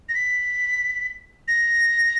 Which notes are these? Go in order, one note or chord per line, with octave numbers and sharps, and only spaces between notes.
A#6
B6
A#6